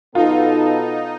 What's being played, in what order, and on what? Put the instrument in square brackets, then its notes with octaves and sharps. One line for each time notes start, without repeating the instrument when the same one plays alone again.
[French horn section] B2 B3 A4 [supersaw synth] D#4 [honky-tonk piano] F4